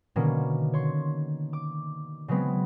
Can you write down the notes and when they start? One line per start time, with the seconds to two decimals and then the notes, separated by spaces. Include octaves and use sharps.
0.16 B2 D3 D#3 A#3 C#4
0.73 C#5 C6
1.53 D6
2.28 C#3 F#3 G#3 B3 C4